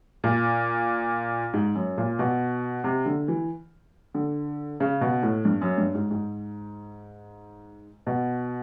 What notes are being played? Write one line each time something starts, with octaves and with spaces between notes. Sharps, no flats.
A#2
G#2
F#2
A#2
B2
C3
D3
E3
D3
C#3
B2
A2
G2
F#2
G2
G#2
G#2
B2